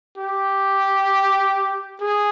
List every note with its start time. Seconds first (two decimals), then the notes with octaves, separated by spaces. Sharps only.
0.18 G4
2.01 G#4